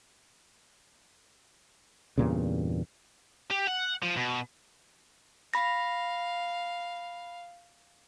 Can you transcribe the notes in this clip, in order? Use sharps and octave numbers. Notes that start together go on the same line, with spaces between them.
E2 G2 A#2 C#3
G4
F#5
F3
B2
F5 B5 A#6